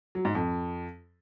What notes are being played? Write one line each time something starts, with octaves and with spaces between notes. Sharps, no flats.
F#3
G#2
F2